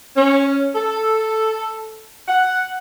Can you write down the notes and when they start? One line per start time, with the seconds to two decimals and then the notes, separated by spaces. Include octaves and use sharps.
0.16 C#4
0.74 A4
2.28 F#5